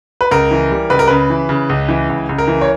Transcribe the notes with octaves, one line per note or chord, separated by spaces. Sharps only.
B4
C#2 A#4
E3
G3
C#2 B4
A#4
C#3 B4
E3
C#3
C#2
E3
C#2
C#2
A#4
E3
C#5